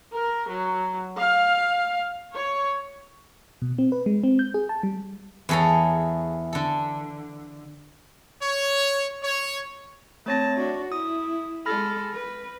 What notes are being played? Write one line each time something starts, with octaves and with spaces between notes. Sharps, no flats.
A#4
F#3
F5
C#5
B2
C4
B4
G#3
C4
G6
G#4
A5
G3
E2 G#4 A4 C#5 A#5
D3 A4
C#5
C#5
A3 C4 C#5 A5 A#6
D4 F#4
E4 D#6
G#3 A4 B5 F6 A#6
B4